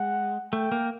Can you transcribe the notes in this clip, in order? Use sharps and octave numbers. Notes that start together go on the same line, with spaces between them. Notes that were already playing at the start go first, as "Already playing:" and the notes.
Already playing: G#3 F#5
A3 G5
A#3